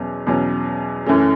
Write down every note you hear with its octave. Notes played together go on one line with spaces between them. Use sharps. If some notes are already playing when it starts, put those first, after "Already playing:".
Already playing: E2 B2 F#3 C#4
E2 B2 F#3 C#4
F#2 E3 A3 C#4